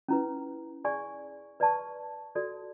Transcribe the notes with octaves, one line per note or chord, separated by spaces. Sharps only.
C#4 E4 B4
G#4 D5 G#5 C#6
B4 D5 A5 C#6
F#4 A4 D5